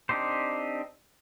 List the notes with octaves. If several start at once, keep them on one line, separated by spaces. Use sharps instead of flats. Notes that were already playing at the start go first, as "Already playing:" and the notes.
C4 D4 D#4 G4 C5